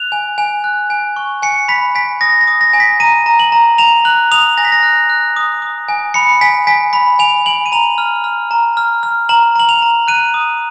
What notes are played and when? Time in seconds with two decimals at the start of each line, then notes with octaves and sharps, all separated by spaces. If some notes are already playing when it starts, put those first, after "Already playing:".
Already playing: F#6 F7
0.12 G#5
0.38 G#5
0.64 F#6
0.90 G#5
1.16 C#6
1.42 G#5 C#7
1.68 B5 B6
1.95 G#5 B6
2.21 D#6 A#6
2.41 A#6
2.47 D#6
2.61 A#6
2.73 G#5
2.80 B6
3.00 A#5 D#7
3.26 A#5
3.39 F#7
3.52 A#5
3.78 A#5 F7
4.05 F#6 F#7
4.31 D#6 F7
4.57 G#5 A#6
4.65 B6
4.72 A#6
4.83 F#6
5.10 F#6
5.36 D#6
5.62 D#6
5.89 G#5
6.14 B5 C#7
6.41 G#5 B6
6.67 G#5 B6
6.93 B5 B6
7.19 G#5 F7
7.46 G#5 F#7
7.66 D#7
7.72 A#5 F7
7.98 F6
8.24 F6
8.51 A#5
8.77 F6
9.03 F6
9.29 A#5 F#7
9.56 A#5 F#7
9.69 F7
9.82 A#5
10.08 F#6 D#7
10.34 D#6